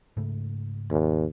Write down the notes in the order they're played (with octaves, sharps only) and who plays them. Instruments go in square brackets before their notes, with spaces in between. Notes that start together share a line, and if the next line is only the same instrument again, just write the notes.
[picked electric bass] G#2 C#3 A3
[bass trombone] D#2